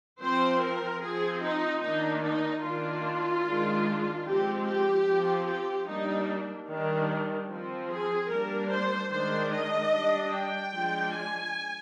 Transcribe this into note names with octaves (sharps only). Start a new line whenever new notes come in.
F3 C4 C5
A#4
F3 C4 G#4
D#4
D#3 A#3 D4 D#4
D#4
D#3 A#3 D4 F4
D#3 G#3 D4
F3 G#3 C4 G4
G4
F3 C4
G4
G3 A#3 D4 D#4
D#3 G3 D4
F3 C4
G#4
G3 A#3 D4 A#4
C5
D#3 G#3 D4 C5
D#5
G3 D4
G5
F3 G#3 D4
G#5